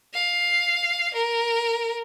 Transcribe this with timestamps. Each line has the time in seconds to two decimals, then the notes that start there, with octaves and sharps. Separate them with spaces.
0.14 F5
1.14 A#4